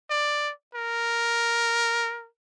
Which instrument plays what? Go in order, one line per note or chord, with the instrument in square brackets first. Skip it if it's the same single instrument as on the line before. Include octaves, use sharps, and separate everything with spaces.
[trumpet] D5
A#4